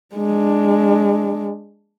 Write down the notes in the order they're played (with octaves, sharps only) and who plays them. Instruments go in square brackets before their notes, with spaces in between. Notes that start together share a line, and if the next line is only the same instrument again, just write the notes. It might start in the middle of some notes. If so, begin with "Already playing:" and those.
[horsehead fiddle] G#3 D4